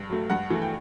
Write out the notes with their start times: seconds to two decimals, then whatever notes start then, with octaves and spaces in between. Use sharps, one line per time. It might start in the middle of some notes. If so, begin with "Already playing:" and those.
Already playing: G2
0.10 F#3 A3
0.30 G2 F#5
0.50 E3 A3
0.62 G5